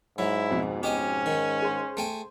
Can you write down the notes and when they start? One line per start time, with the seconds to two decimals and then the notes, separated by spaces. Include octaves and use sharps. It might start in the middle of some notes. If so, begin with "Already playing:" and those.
0.18 G#2 F#3 E4
0.51 F2 B2
0.83 G#2 C#4 G4 D#5 G#5
1.26 D#3
1.62 G#4 C5
1.97 A3 G5 G#5